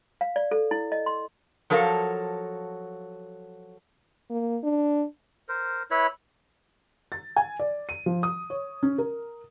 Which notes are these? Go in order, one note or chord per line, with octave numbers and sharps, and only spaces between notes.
F5
D5
A4
E4
D#5
C6
F3 F#3 A4 A#4 F5
A#3
D4
A#4 C5
E4 B4 C#5 B5
A6
G#5
D5
D#7
F3
D#6
C#5
C#4
A#4